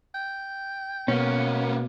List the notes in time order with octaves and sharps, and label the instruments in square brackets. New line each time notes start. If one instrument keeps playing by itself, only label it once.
[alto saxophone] G5
[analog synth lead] B2 [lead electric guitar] A#3 B3 [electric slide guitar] C#4